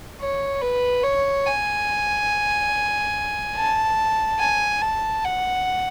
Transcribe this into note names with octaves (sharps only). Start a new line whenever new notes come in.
C#5
B4
C#5
G#5
A5
G#5
A5
F#5